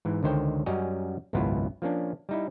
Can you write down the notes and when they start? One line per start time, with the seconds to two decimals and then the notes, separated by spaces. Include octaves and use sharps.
0.05 G#2 E3
0.23 C#2 D3 D#3 C5 C#5 G5
0.66 F#2 G3 C#4 F#4 D#5 A#5
1.33 G#1 C#2 F#2 B3 E4 F4
1.82 F3 A#3 C#4 D4
2.29 G3 D#4 E4